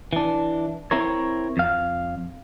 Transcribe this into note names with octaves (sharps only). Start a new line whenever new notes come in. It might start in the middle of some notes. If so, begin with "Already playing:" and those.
E3 D4
C4 E4 A#4 C#5
F2 F5